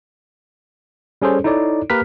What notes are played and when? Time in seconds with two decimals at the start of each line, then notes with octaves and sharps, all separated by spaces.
1.22 G3 C#4 G#4 A4 C5 C#5
1.44 D#4 E4 A4 C#5 D5
1.90 A#3 G4 A#4 B4 F6 B6